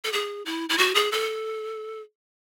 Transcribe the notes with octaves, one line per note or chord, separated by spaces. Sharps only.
A4
G#4
E4
E4
F#4
G#4
A4